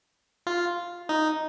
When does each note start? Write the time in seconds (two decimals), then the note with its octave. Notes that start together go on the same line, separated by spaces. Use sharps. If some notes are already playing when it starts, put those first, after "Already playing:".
0.47 F4
1.09 D#4